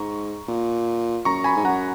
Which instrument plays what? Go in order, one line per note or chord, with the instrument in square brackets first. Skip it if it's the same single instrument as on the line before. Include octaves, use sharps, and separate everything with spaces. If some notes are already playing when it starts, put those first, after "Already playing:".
Already playing: [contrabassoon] G#2 [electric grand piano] A#5 C#6
[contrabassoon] A#2
[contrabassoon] F#2 [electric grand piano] A#5 C#6
[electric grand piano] G#5 B5
[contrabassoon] G#2
[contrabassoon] F#2 [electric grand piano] F#5 A#5